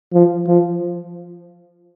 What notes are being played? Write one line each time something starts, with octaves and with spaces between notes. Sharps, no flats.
F3
F3